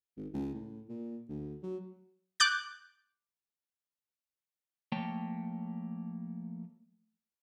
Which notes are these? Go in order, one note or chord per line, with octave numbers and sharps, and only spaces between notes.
G#1
C#2
A2
A#2
D2
F#3
D6 F#6 G6 A6
F3 A3 A#3 C#5 G5 A5